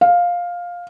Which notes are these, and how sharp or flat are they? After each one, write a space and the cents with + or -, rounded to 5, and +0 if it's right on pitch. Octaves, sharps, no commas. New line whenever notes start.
F5 +10